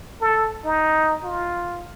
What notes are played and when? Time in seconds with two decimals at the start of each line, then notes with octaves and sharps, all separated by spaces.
0.21 A4
0.64 D#4
1.24 F4